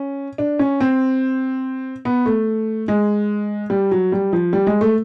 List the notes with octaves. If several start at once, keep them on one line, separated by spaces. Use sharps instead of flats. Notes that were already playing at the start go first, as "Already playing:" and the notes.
Already playing: C#4
D4
C#4
C4
B3
A3
G#3
G3
F#3
G3
F3
G3
G#3
A3